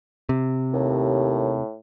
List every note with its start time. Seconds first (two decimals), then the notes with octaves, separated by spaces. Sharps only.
0.29 C3
0.74 D#2 A2